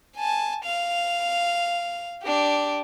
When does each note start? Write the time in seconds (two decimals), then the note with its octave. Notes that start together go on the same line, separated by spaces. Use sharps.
0.16 G#5 A5
0.64 F5 F7
2.24 D4 G4